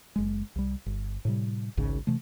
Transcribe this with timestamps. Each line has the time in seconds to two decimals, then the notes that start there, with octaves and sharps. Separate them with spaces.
0.16 F#1 G#3
0.56 C2 G3
0.86 G1
1.25 A2 C3 G3
1.77 G#1 C#2 G#2 C#3
2.07 C3 E3 A3